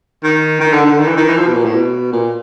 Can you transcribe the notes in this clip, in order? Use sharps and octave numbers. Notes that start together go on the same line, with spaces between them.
D#3
D#3
D3
D3
D#3
E3
D#3
E3
F3
B2
A#2
A2
B2
A#2